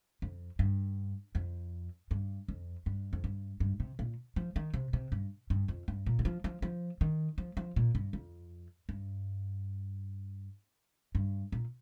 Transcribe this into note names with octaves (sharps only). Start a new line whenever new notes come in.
F2
G2
F2
G2
F2
G2
F2
G2
G2
C3
A#2
F3
D#3
C3
C3
G2
G2
F2
G2
A#2
D#3
F3
F3
F3
D#3
F3
F3
A#2
G2
F2
G2
G2
A#2